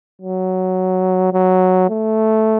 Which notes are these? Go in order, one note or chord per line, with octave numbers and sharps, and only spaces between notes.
F#3
F#3
A3